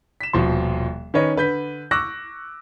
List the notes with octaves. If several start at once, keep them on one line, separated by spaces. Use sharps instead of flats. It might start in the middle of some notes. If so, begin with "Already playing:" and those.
B6 E7
D#1 B2 F3 C6
D#3 C#4 B4 C#5 D#5
D3 B4 G6 B6
C#6 D6 E6 F#6 A#6